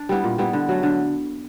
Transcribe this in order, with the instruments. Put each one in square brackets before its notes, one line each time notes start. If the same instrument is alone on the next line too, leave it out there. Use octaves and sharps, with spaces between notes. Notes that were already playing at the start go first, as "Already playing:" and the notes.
Already playing: [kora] D4
G3 B3 E4
A#2
G3 B3 E4
D3
F#3 A3
D3